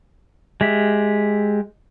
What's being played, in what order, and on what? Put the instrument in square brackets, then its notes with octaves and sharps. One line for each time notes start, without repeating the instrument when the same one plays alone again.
[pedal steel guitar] G#3 G4 E5